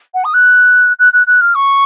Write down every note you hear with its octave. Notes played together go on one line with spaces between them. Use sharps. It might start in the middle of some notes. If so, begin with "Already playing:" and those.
F#5
D#6
F#6
F#6
F#6
F#6
F6
C#6